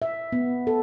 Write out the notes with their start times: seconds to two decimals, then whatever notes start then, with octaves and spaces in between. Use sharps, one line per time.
0.02 E5
0.32 B3
0.67 A4